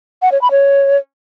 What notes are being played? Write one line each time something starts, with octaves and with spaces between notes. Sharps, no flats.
F#5
C#5
B5
C#5